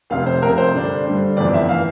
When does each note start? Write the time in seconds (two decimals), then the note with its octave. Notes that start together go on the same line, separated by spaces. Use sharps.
0.10 F1 F2 C3 F5
0.26 C5
0.42 F1 F2 C3 A#4
0.58 C5
0.74 G2 D3 G3 D4
1.05 G2 D3 G3 D4
1.37 G1 F2 E3 D5
1.54 E5
1.69 E3 F5